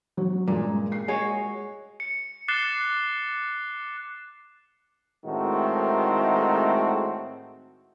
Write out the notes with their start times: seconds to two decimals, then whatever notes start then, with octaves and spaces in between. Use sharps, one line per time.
0.17 F#3
0.48 G2 A#2 G#3
0.92 C7
1.08 G#3 F#4 C#5
2.00 C#7
2.48 D6 F#6 A6 C7 E7 G7
5.25 A2 D#3 G#3 A3 C4 F#4